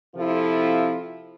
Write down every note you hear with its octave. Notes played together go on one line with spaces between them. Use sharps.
C3 F3 C4 E4 F4 A4